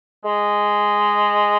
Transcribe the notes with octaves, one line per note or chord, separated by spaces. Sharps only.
G#3